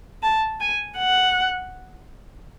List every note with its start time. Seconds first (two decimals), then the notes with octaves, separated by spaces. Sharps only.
0.23 A5
0.60 G#5
0.98 F#5